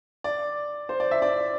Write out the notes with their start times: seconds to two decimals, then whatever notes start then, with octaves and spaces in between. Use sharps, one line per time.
0.24 D5
0.89 C5
1.00 D5
1.11 E5
1.22 D5